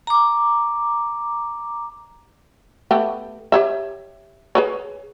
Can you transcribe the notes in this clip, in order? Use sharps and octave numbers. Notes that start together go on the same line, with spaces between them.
A#5 D6
A3 B3 G4
G4 C#5 E5
G#4 B4 C#5